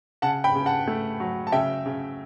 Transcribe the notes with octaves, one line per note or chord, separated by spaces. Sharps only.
C#3 F#5 A5
G5 B5
C#3
F#5 A5
A3
F#3
A5
C#3 E5 G5
C#3